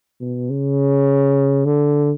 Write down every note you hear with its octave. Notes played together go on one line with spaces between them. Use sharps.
B2
C#3
D3